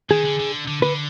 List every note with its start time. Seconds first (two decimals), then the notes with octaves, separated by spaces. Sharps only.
0.10 D#3 G#4
0.25 D3
0.40 D3
0.68 D3
0.82 D3 B4